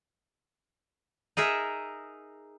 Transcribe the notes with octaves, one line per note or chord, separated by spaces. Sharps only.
D#4 G#4 A#4 E5